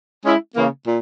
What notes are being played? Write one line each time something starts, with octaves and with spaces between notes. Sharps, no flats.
G#3 C#4 E4
C#3 E3 A#3
A#2